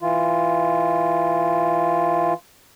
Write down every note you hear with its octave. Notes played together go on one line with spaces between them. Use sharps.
E3 F4